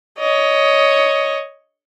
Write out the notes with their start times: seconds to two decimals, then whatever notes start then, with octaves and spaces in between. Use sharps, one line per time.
0.19 C#5 D#5